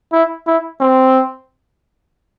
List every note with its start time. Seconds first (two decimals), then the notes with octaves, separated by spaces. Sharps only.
0.13 E4
0.47 E4
0.81 C4